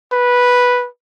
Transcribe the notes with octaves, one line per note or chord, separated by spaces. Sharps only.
B4